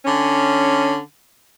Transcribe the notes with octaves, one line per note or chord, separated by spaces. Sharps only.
D3 C#4